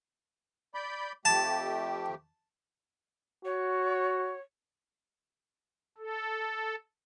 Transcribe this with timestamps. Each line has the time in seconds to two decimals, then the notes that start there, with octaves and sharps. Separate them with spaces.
0.74 D5 B5 G6
1.25 F2 A3 G4 A5
3.45 F#4 C#5
5.98 A4